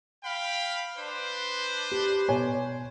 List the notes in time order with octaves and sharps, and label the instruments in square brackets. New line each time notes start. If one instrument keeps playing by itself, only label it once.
[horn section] F5 G5 B5
D4 B4 C5
[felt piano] G4
B2 C#5 G#5